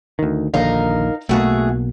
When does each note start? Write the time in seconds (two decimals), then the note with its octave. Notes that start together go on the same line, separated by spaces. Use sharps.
0.19 D2 D#3
0.54 A#1 D#2 D3 D#4 A#4 F5
1.29 B1 B2 A3 A#3 F#4 G#4